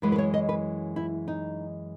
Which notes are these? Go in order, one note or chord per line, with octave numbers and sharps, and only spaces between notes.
F#2 E3 G#3 B4
B4
C#5
D#5
B4
E4
D#4